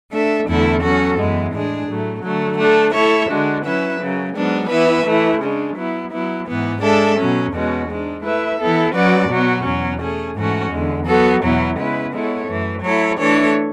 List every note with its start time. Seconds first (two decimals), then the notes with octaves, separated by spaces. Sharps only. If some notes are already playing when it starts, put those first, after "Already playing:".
0.11 A3 D4 A4 E5
0.46 E2 D3 A3 E4 A4
0.81 F#3 C#4 F#4 A4
1.17 F#2 E3 G#3 B3
1.52 A2 G#3 D4 G#4
1.87 A2 F#3 A3
2.22 D3 F#3 A3
2.58 A3 D4 A4
2.93 A3 E4 A4 C#5 E5
3.29 D3 G#3 D4 F#4
3.64 F#3 C#4 E4 B4 E5
4.00 F#2 C#3 F#3
4.34 G#2 F#3 B3 D4
4.70 E3 B3 E4 B4 E5
5.06 E3 A3 E4
5.40 C#3 G#3 D4
5.76 F#3 B3 E4
6.11 F#3 B3 E4
6.47 G#2 E3 B3
6.81 G#3 D4 A4 E5
7.17 B2 F#3 C#4
7.52 E2 B2 G#3 C#4 F#4
7.88 G#2 G#3 D4
8.23 A3 E4 B4 E5
8.59 E3 B3 E4 A4
8.93 F#3 C#4 F#4 B4 D5
9.29 B2 F#3 B3 F#4
9.64 E2 B2 F#3 C#4
10.00 A3 C#4 G#4
10.35 G#2 E3 A3 C#4 F#4
10.70 E2 D3 G#3
11.06 F#3 B3 F#4 A4
11.41 E2 B2 F#3 B3 E4
11.77 C#3 G#3 B3 E4 B4
12.12 G#3 B3 E4 A4 C#5
12.48 F#2 E3 A3
12.82 F#3 A3 E4 A4 C#5
13.18 E3 A3 D4 A4 C#5